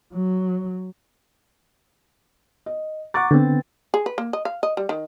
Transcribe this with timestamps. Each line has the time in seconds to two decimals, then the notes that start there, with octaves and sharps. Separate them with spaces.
0.14 F#3
2.66 D#5
3.14 F#5 A#5 C#6 D6 A6
3.31 D3 B3 C4
3.94 G#4
4.06 B4
4.18 A#3
4.33 D#5
4.45 F5
4.63 D#5
4.77 G3
4.89 D#3